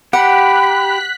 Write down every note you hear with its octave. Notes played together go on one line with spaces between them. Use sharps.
G4 F#5 B5 F#6 B6